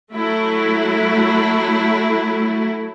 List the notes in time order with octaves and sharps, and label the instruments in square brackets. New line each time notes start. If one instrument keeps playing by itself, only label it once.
[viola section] F#3 A3 E4